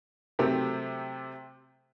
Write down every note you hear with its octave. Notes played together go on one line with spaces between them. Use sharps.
C3 F#3 A3 C4 G4